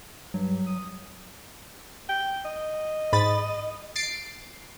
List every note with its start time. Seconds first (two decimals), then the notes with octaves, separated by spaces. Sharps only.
0.34 G2 F#3
0.67 D#6
2.09 G5
2.45 D#5
3.13 G#2 B5 A6
3.96 A6 C7 D7